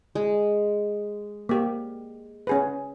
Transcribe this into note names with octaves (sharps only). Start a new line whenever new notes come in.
G#3
A#3 G4
C#4 G#4 B4